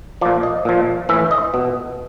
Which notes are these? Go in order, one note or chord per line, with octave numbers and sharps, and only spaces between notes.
A#2 F3 D5
D#5
A#2 F3
A2 E3 E5
D#5
B2